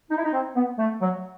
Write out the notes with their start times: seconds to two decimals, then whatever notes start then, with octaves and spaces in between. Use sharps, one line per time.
0.09 D#4
0.17 E4
0.23 D#4
0.33 C4
0.56 B3
0.78 A3
1.01 F#3